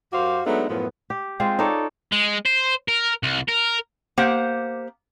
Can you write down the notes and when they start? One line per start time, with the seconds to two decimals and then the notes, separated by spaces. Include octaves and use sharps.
0.13 F#2 F#4 G4 C5 F5
0.46 F#3 G#3 A3 B3 D4 D#4
0.69 F#2 A2 F3 B3
1.10 G4
1.40 G#3 C4 F4 C5
1.59 D#4 A4 C#5 D5
2.12 G#3
2.45 C5
2.88 A#4
3.23 C2
3.49 A#4
4.18 A#3 G4 C5 F#5